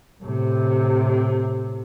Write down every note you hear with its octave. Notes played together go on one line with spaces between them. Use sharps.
A2 C3